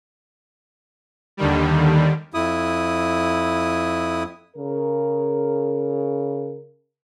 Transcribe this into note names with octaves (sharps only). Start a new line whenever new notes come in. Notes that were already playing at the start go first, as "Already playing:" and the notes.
D#2 D3 D#3 G3
F2 E4 D#6
C#3 A#4